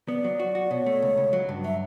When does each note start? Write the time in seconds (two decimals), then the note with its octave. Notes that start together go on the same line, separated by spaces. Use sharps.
0.08 B3 D5
0.24 F#3
0.40 F#4
0.55 F#4
0.71 B2 C#5
0.86 A3
1.02 C#2
1.18 C#2
1.33 F#3
1.49 G2
1.64 F#3 E5